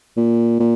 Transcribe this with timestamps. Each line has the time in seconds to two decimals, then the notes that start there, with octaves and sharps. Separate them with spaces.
0.17 A#2
0.60 A#2